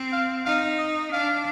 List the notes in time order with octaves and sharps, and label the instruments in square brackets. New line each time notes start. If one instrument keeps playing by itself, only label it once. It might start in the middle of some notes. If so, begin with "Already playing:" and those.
Already playing: [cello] C4
[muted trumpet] F5
[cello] D#4 [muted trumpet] F5
[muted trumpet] D#5
[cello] D4 [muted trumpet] F5